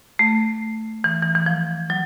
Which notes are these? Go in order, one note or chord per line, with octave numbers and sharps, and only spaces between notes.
A3
E3
E3
E3
F3
F#3